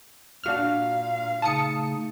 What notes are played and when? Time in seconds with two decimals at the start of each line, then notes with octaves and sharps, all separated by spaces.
0.44 A#2 D4 F#4 F5 F6
1.42 C#3 A3 D#4 A5 D#6 C#7